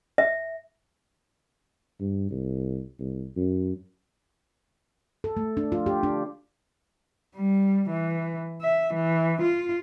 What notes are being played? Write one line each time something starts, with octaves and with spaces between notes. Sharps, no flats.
E5
G2
C2
C2
F#2
A4
A3
D4
F4
G4
D4
G3
E3
E5
E3
F4